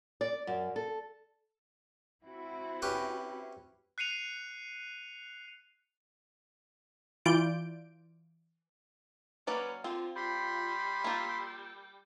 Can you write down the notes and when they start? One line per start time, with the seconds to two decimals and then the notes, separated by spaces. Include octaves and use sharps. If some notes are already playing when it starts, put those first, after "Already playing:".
0.21 D5
0.47 F#2
0.76 A4
2.24 C4 E4 F#4
2.82 C#4 G4 B4
3.98 F#6 C7 C#7 D#7 F7
7.26 E3 F4 D5 G6 D7
9.47 F#3 A#3 C#4 B4 D5
9.84 D3 C4 F4
10.16 G3 B5 C6
11.04 A#3 F4 E6